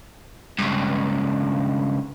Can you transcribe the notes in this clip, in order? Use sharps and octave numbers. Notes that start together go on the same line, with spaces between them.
C#2 G2